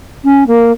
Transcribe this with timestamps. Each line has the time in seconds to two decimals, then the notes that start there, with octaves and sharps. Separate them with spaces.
0.24 C#4
0.47 A#3